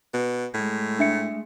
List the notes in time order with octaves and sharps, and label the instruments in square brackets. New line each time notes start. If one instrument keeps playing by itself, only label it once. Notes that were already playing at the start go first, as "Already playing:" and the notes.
[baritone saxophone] B2
[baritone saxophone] A2 [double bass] G#3 A3
[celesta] D4 E5 C#7